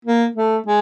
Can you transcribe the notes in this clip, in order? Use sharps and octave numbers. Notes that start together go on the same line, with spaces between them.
A#3
A3
G#3